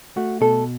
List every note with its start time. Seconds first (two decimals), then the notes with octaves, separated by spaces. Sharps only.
0.17 A3 F#4
0.41 B2 A4